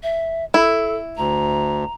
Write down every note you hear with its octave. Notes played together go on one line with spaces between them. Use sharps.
E5
E4 A4
D2 A#5